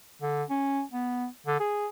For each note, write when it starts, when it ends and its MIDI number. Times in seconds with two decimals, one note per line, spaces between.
0.22 0.44 50
0.50 0.82 61
0.92 1.27 59
1.47 1.59 50
1.60 1.88 68